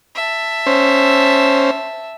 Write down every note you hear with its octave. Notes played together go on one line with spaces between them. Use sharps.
E5 A5
C#4 C5